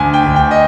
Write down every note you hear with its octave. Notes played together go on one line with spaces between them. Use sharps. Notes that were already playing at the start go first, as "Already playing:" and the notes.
Already playing: D2 G#5
G5
D2
G5
D#5